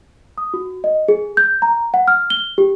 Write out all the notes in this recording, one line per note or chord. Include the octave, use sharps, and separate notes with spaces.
D#6
F#4
D#5
G#4
G6
A#5
F#5
F6
G7
G4